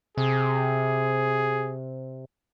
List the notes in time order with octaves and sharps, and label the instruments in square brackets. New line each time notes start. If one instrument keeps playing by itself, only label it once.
[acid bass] C3 [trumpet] G#4